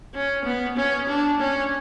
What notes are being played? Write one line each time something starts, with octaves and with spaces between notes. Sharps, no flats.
C#4
B3
C#4
D4
C#4